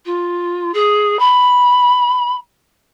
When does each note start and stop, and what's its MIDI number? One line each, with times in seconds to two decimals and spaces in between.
0.05 0.72 65
0.74 1.19 68
1.19 2.34 83